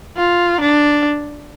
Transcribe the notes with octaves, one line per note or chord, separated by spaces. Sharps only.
F4
D4